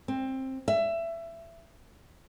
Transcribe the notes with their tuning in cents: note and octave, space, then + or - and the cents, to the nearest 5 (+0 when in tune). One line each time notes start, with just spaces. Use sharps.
C4 +15
E5 +20